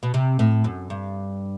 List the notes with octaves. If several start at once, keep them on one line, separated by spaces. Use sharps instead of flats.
B2
C3
A2
F#2
G2